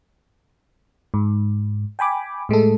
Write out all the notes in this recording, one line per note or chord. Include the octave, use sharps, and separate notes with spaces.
G#2
G5 G#5 B5 D6
A2 G#3 A3 A4